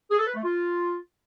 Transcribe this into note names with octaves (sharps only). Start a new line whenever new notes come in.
G#4
A4
B4
A3
F4